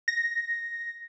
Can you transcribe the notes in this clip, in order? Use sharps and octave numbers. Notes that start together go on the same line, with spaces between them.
A#6